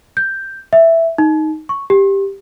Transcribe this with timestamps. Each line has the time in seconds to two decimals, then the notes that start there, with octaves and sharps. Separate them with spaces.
0.17 G6
0.73 E5
1.18 D#4
1.69 C#6
1.90 G4